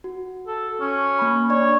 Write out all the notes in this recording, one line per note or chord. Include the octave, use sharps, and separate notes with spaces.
F#4
A4
C#4
A#3 B5
D4 C#5 D5 G#6